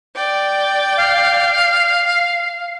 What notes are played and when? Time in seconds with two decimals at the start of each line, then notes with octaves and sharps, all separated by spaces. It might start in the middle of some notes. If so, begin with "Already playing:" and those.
0.15 D5 G5
0.97 F5